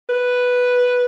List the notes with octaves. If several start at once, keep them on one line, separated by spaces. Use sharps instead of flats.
B4